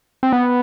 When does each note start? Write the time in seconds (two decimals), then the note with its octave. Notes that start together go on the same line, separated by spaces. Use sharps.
0.23 C4
0.33 B3